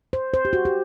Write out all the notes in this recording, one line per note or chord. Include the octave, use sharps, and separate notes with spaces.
C5
C5
G4
F#4
G4